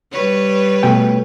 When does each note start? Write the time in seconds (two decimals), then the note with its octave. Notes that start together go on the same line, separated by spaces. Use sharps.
0.12 G3 B4 C#5
0.83 B2 A3 G5